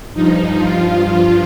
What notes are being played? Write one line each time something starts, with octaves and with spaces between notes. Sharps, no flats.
G2 F3 D#4
F4